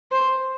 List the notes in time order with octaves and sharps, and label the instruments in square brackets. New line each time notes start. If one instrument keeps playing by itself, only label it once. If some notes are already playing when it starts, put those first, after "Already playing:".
[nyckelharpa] C5